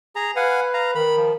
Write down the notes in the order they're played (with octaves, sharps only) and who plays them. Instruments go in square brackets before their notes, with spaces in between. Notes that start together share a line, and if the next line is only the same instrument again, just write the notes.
[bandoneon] G#4 A#5
[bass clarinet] B4 [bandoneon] F5 F#5 G#5
[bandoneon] F5 A#5
[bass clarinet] D#3 [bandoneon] B5
[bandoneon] F3